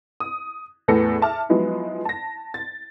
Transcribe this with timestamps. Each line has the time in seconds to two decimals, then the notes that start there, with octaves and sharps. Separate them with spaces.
0.20 D#6
0.88 E2 A2 B3 A4 A#6 C#7
1.22 E5 A5 D6 F6
1.49 F3 F#3 G#3 B3 D#4 E4
2.05 A5 A#6
2.54 A6